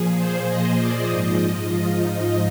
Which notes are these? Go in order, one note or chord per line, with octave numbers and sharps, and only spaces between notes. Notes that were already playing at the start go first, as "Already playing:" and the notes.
Already playing: A#2 F3 G#4
C5
D#5
D5
G#2 F3 D#5
F4
D#4